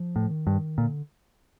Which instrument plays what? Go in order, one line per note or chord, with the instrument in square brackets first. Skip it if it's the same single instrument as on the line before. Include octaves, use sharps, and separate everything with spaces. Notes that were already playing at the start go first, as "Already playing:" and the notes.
Already playing: [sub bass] F3
[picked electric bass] A2
[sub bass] D#3
[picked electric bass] G2
[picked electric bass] A#2 [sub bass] D3